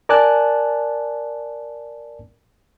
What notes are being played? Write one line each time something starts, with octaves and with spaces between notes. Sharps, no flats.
A#4 D5 G#5 A5 F#6